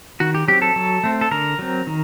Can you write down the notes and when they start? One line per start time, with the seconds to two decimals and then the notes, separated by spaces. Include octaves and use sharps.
0.20 D#3 F#4
0.35 G4
0.48 F#3 C4 G4
0.62 A4
0.76 F#3
1.04 A3 C4
1.21 A4
1.31 D3 A#4
1.59 F#3 C4
1.87 D#3